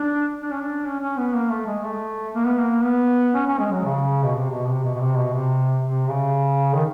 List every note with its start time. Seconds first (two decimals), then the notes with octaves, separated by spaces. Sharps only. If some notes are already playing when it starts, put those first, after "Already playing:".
Already playing: D4
0.42 D4
0.51 C#4
0.60 D4
0.84 C#4
1.00 C#4
1.17 B3
1.34 A#3
1.50 A3
1.67 G#3
1.84 A3
2.34 A#3
2.46 B3
2.59 A#3
2.84 B3
3.34 C#4
3.46 C#4
3.59 G#3
3.72 F#3
3.84 C#3
4.23 B2
4.35 C3
4.51 B2
4.68 C3
4.84 B2
4.95 B2
5.01 C3
5.17 B2
5.34 C3
5.84 C3
6.09 C#3
6.74 D#3